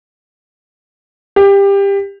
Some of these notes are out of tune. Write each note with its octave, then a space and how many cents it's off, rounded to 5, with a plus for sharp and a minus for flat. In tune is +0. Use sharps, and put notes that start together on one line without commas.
G4 +20